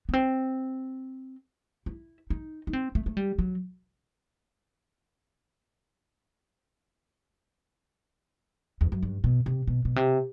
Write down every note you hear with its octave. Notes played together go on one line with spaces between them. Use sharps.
B3
C4
E4
D#4
D#4
C4
A3
A3
G3
F#3
E2
F#2
G2
B2
C3
B2
B2
C3